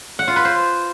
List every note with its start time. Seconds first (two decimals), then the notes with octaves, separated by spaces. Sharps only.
0.19 F#5
0.28 F4
0.36 B4
0.45 C5